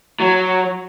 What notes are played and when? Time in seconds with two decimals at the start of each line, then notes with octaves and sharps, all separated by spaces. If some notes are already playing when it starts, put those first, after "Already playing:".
0.21 F#3